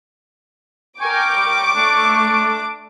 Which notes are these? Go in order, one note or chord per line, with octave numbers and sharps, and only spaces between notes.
A#4 G5 G#5 C#6 D6
G3
A3 D4